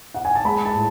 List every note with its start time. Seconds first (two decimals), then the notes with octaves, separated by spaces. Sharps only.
0.14 F#5
0.25 G#5
0.35 A5
0.45 G#3 B5
0.65 A5
0.75 A2